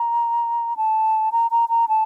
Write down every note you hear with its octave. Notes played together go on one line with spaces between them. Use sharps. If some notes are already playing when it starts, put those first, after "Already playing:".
Already playing: A#5
A5
A#5
A#5
A#5
A5